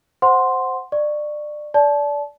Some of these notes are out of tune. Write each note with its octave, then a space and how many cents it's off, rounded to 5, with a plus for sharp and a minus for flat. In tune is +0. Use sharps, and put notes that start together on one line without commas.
C5 +0 F#5 +0 C6 +0
D5 +25 C#6 +0
D5 -20 A5 -25